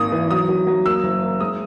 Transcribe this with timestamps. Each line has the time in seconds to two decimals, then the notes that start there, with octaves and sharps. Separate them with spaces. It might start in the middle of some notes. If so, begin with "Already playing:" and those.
Already playing: G#1 A#3 D#6
0.12 E3
0.31 F#3 D#6
0.49 F#3
0.67 F#3
0.86 A#3 E6
1.04 F#1
1.22 A#3
1.40 G#3 D#6